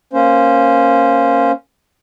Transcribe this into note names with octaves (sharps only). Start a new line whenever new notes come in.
A#3 C#4 C5